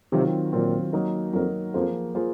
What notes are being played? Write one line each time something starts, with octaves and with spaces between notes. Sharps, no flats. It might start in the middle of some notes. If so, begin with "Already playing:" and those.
C3 D#3 F#3 C4 F4
A#2 D#3 F#3 C4 F4
F#3 A#3 D#4 A#4
F2 F#3 A#3 D#4 A#4
F2 F3 A#3 F4 G#4 C5
F3 A#3 F4 G#4 C5